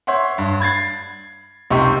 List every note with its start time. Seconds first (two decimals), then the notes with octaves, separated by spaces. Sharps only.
0.07 C#5 E5 F#5 C6
0.38 G2
0.60 B5 G#6 A6 C7
1.70 C#2 C3 D#4 G4 C6 C#6